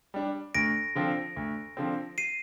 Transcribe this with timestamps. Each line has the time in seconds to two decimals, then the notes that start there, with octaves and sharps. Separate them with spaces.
0.14 G3 D4
0.55 D2 A#6 D7
0.96 D3 F3 C4
1.36 D2
1.77 D3 F3 C4
2.18 C7 D#7